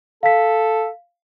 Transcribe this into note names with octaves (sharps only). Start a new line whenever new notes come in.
A4 F5 B6